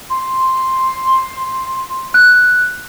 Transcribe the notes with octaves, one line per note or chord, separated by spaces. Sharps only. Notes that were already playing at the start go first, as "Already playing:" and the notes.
C6
F#6